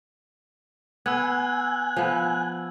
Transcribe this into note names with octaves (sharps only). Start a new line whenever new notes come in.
B3 G#5 E6 F#6 G#6
F3 B3